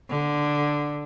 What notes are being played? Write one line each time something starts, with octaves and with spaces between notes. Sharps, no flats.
D3